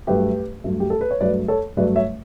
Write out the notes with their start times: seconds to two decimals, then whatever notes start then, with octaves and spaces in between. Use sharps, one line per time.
0.07 G2 F#3 A3 G4 B4
0.64 G2 F#3 A3
0.80 G4
0.90 A4
1.01 B4
1.11 C#5
1.21 G2 F#3 A3 B4 D5
1.48 A4 C#5
1.77 G2 F#3 A3 B4 D5
1.96 C#5 E5